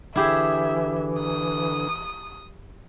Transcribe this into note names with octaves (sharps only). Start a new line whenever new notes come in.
D3 E3 E4 G4 G#4 E5
D#6